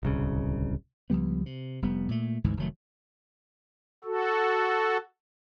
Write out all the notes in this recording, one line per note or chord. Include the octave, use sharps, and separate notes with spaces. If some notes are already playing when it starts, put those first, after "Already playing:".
D1 C2 C#3
C#2 F3 G3 B3
C3
F1 G3 B3
A#2 A3
G#1 D2 G#2 E3
F1 D#3 F#3 A3
F#4 A4